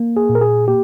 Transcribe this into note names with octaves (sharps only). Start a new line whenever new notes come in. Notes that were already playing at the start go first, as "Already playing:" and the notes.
Already playing: A#3
G#4
A#2
A#4
G#4
A#3 G4